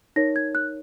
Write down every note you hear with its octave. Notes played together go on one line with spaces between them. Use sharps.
D#4 A#4 C#5 A#6
G#6
F#6